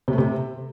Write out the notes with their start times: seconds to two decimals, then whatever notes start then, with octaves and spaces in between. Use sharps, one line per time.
0.08 C3
0.13 A3
0.18 C3